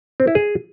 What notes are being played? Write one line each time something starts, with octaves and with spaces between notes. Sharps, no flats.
C4
E4
G#4